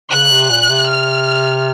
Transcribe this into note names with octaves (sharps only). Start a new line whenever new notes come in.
C#3 F#6
C3
A#2
C3
F6